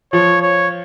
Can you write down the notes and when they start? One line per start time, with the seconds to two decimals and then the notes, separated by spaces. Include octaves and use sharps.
0.13 F3 C#5
0.42 C#5